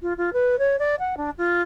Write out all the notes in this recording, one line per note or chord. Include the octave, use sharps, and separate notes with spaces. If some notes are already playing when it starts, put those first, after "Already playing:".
F4
F4
B4
C#5
D5
F#5
D4
F4